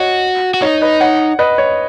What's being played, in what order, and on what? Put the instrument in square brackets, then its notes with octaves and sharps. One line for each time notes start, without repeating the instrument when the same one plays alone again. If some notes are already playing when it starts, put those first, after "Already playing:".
Already playing: [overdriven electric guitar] F#4 [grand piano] C#5 D#5
[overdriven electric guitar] F#4
[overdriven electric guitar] D#4 [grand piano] C#5
[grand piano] B4 D#5
C#5 F#5
B4 D#5
C#5